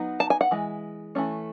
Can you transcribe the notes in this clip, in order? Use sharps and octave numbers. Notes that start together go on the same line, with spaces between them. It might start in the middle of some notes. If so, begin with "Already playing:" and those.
Already playing: F#3 B3 D#4
A5
G#5
F#5
E3 G#3
E3 A3 C#4